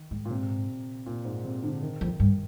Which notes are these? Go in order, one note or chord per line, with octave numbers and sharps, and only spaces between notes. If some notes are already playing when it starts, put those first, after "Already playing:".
Already playing: D#3
G#2
A#2
C3
A#2
G#2
C3
D3
D#3
F2
G2